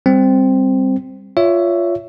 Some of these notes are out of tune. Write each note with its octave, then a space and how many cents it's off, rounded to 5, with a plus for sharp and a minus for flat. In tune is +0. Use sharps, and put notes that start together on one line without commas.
G3 +10 C4 +0
F4 +0 C#5 +20 E5 +10